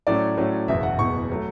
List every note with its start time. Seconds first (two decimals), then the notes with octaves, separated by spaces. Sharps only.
0.07 A2 F#3 A3 C#4 D5
0.37 A2 F#3 A3 C#4
0.67 F#1 E2 B2 E5
0.83 F#5
0.99 F#1 E2 B2 C#6
1.32 F#3 A3